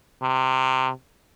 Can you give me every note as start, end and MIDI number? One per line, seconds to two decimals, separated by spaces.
0.22 0.90 48